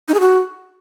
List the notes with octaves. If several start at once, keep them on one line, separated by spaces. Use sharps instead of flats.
D#4
G#4
F#4